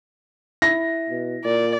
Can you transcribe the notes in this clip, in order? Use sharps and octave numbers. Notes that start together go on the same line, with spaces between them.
E4 A#6
B2
A#2 D5